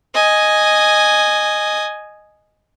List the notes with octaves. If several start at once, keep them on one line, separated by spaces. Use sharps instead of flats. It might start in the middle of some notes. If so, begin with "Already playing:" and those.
D#5 G#5